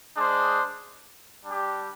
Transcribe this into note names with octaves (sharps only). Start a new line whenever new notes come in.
G#3 D4 G#4 C5
G3 D4 G4